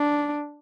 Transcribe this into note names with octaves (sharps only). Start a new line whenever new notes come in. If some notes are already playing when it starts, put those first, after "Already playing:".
Already playing: D4